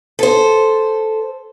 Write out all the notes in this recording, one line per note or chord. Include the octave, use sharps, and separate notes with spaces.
A4 C5